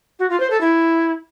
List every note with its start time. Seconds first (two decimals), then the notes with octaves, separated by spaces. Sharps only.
0.19 F#4
0.29 F4
0.40 C5
0.50 A4
0.60 E4